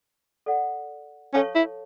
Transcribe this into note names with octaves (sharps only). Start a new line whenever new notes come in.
A4 D5 F#5
C#4 A4 C#5 F5 A5 C#6
E4